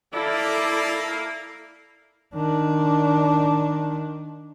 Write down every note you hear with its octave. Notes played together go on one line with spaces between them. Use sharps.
A#3 E4 A4 D5
D#3 D4